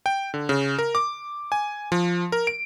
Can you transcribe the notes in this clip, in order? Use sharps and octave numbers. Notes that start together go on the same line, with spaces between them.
G5
D3
C#3
A#4
D6
G#5
F3
A#4
D7